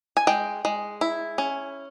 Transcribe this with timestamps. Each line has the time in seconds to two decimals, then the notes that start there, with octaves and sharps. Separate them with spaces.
0.17 G#5
0.27 G#3 G5
0.65 G#3
1.01 E4
1.38 C#4